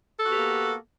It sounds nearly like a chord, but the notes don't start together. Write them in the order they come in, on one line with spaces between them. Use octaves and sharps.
A4 F#4 B3 G4 A#3